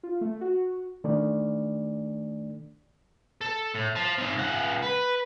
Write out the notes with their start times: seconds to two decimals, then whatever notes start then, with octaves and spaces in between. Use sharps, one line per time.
0.03 F4
0.21 A3
0.41 F#4
1.04 D#3 A3 D4 D5
3.41 A4
3.75 A2
3.95 C5 A5
4.18 C4 D#4
4.35 C#2 F#5
4.82 B4